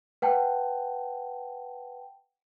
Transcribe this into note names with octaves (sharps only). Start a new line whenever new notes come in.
B4 F#5 G5 A5